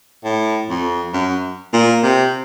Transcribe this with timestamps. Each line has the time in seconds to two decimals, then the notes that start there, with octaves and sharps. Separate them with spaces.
0.24 A2
0.69 F2
1.13 F#2
1.73 A#2
2.03 C3